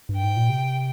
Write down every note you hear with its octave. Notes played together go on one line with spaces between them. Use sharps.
G2
G5
G#2
A#2
C3